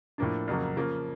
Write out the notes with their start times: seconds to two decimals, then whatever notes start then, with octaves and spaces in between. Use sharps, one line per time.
0.18 A2 F3 A#3 D4
0.48 F2 C#3 F#3 A#3
0.76 C#3 F3 A#3